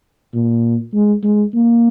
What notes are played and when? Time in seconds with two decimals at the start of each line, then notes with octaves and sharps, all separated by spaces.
0.34 A#2
0.93 G#3
1.23 G#3
1.54 A#3